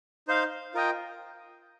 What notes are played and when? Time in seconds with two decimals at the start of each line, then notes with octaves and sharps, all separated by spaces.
0.28 D#4 C5 F5
0.74 F4 A#4 D#5 G5